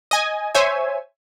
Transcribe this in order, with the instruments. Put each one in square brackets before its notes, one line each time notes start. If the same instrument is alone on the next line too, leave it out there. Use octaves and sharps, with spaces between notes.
[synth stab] D#5 G#5
C5 C#5 E5 G#5